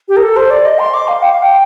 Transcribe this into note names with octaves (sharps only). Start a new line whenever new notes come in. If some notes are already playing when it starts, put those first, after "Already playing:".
G4
A#4
A4
C5
D5
D#5
C6
D6
F5
G5
F5
G5